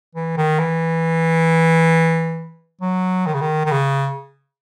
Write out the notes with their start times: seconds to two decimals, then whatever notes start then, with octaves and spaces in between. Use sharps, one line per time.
0.15 E3
0.37 D#3
0.59 E3
2.81 F#3
3.26 D#3
3.34 C#3
3.41 D#3
3.65 D#3
3.71 C#3